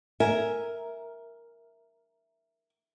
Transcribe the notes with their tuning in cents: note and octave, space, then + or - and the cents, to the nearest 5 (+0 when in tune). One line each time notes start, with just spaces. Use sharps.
A#4 +0 E5 +0 G#5 +0